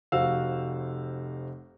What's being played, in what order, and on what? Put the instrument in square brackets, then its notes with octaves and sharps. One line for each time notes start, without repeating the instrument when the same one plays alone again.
[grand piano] F1 F#4 C5 F5 E6